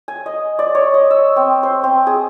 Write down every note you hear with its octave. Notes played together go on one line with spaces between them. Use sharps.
G#5
D#5
D5
C#5
D#5
E6
C4
C5
C4
G#4